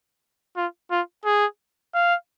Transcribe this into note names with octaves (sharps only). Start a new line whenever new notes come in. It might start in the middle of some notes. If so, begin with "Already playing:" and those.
F4
F4
G#4
F5